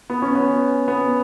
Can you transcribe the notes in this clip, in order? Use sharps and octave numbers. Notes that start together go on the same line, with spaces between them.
B3
C#4
B3
B3